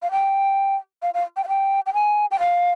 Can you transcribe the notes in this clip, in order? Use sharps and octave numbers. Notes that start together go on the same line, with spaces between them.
F5
G5
F5
F5
G5
F5
G5
G5
G#5
G5
F5